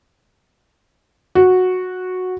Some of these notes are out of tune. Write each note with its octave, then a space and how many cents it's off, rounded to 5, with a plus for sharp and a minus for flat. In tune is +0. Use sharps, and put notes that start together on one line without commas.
F#4 -10